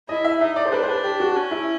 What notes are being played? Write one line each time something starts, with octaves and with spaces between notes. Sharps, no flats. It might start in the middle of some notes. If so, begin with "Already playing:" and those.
E4 D#5
E5
D#4 E5
D5
C5
D4 B4
C5
B4
G4
F#4
C#4
E4